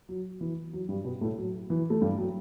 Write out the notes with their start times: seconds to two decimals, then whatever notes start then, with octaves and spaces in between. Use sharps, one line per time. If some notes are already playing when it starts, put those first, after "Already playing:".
0.09 F#3
0.41 E3
0.73 F#3
0.89 G2 G3
1.04 B2 B3
1.21 A2 A3
1.38 F#3
1.70 E3
1.90 A3
2.01 G2 G3
2.18 F#3